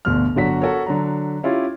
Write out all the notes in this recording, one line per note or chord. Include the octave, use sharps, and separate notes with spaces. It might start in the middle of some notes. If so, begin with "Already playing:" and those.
G1 D2 B2 F6
G1 D3 F#3 F#4 B6
F#4 A4 A#4 C#5
D3 F#3 A#5
C#4 E4 F4 G4